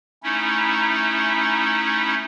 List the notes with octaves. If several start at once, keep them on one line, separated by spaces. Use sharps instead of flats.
A3 C#4 D#4 E4